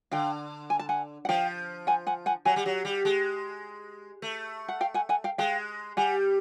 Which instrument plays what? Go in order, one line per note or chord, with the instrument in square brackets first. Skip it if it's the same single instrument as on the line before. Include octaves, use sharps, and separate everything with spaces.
[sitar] D3 [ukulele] F5 G5
[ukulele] G#5
A5
F#5 G#5
F#5
[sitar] F3 [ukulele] F5 G5
[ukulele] F#5 G#5
F#5 G#5
F#5 G#5
[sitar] F#3 [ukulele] F#5 G#5
[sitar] G3
F#3
G3
G#3
A3
[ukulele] F#5
F5 G5
F#5 G#5
F#5 G#5
F5 G5
[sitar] G#3 [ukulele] F5 G5
[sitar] G3 [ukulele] F#5 G#5